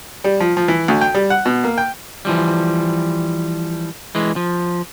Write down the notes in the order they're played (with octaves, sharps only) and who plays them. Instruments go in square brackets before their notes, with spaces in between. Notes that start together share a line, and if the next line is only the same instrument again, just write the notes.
[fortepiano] G3
F3
F3
E3
D2
G5
G3
F#5
B2
A#3
G5
[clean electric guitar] E3 F3 G3
E3 G#3
F3